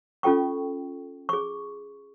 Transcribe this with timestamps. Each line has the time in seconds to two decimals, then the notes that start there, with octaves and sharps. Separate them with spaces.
0.23 C#4 F4 A4 G5 C#6
1.29 G#4 C#6